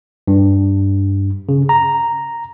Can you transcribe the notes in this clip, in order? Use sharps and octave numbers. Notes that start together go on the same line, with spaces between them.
G2
C#3
A#5